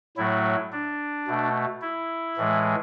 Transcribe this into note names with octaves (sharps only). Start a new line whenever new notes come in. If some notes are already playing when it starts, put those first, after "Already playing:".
A2 F#3 A3 E4
D4
B2 A3
E4
A2 E3 G#3